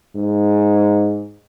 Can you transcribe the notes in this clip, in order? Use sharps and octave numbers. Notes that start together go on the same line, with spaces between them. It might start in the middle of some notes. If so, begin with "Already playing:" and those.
G#2